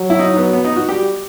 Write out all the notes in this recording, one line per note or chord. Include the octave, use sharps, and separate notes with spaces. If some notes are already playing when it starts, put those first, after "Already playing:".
Already playing: F#3
E4
D#4
B3
B3
D#4
F#4
G3 G4